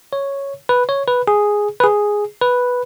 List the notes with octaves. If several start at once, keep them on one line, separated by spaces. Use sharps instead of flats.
C#5
B4
C#5
B4
G#4
B4
G#4
B4